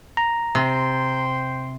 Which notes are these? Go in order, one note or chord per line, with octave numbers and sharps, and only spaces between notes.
A#5
C3 C5 G5 C6